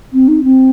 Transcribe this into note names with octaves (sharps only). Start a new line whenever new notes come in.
C4
D#4
C4